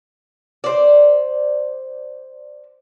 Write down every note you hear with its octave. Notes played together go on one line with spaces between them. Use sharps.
C5 D5